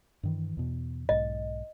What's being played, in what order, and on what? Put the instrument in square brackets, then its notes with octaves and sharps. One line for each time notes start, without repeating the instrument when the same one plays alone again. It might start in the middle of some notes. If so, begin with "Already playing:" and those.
[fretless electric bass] G2 D#3 E3
E2 B2
[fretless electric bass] B1 G#2 [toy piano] D#5